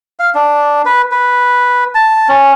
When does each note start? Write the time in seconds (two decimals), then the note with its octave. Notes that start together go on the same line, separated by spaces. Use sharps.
0.19 F5
0.35 D4
0.86 B4
1.12 B4
1.95 A5
2.29 C#4